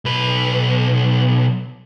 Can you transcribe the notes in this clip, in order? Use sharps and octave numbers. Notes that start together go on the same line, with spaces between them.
B1 B4